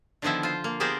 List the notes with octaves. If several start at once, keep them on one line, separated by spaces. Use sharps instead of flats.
D3 D#3 F3 B3 E4
F4 C5
A#3
B3 G4 G#4 A#4 C5 D5